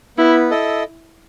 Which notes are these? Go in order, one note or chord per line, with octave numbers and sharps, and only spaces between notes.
B3 E4
E4 A4 D#5